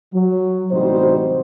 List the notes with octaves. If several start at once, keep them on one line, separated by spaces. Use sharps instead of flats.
F#3
A1 C3 G3 D#4 F#4 C5